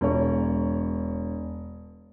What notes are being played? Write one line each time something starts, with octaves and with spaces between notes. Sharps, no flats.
E1 C#5